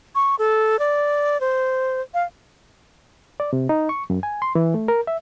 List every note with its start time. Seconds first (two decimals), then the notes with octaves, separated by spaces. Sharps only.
0.15 C#6
0.39 A4
0.79 D5
1.41 C5
2.14 F5
3.40 D5
3.53 C3
3.69 D#4
3.89 C#6
4.10 F#2
4.23 G#5
4.42 C6
4.55 E3
4.74 A3
4.88 A#4
5.07 E5